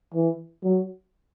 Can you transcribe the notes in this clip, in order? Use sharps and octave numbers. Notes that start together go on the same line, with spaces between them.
E3
F#3